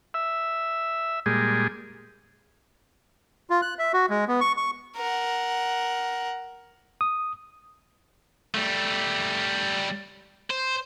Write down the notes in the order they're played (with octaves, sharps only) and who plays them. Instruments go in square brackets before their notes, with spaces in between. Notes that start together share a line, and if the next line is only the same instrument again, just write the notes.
[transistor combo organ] E5
A#2 G3 G#3 G#4
[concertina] F4
F#6
E5
F#4
G#3
B3
C#6
C#6
[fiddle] A#4 F#5
[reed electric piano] D#6
[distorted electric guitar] G3 A3
C5